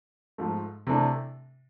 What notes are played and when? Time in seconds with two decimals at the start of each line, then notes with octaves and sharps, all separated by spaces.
0.38 G#2 F3 A3
0.87 C3 E3 A3 D4